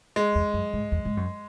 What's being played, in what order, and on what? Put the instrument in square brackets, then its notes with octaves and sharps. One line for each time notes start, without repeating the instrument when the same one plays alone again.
[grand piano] G#3
[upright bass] E2
F#2
G#2
E2
G#2
F#2